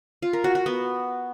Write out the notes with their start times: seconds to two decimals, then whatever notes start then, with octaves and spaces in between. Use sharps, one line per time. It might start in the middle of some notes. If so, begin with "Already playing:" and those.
0.22 F4
0.33 A#4
0.44 F#4
0.55 F#4
0.66 B3